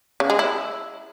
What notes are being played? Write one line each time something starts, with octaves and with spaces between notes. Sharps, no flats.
C#3
G#3
E4